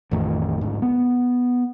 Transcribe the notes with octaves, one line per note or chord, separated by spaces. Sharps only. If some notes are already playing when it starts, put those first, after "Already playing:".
A1 F2 D#3 A3
D2 G#2
B3